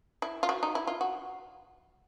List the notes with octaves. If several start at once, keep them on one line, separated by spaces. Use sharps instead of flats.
E4
F4
F#4
D#4
E4
F4
F#4